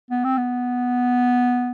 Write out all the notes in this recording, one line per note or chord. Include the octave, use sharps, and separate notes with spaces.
B3
C4
B3